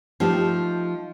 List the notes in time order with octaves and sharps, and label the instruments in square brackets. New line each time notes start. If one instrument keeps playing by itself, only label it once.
[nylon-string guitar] F3 A3 D#4 G4